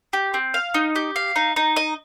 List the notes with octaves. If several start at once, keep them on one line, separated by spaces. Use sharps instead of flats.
G4
C4
F5
D#4
G4
F5
D#4
D#4
D#5